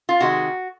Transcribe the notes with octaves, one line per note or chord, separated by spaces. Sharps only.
F4
C3 D#3 G#3 F#4